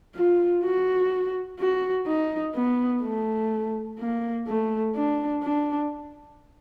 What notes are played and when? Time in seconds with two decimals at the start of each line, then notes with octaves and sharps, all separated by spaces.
0.16 F4
0.64 F#4
1.59 F#4
2.07 D#4
2.55 B3
3.03 A3
3.99 A#3
4.47 A3
4.95 D4
5.43 D4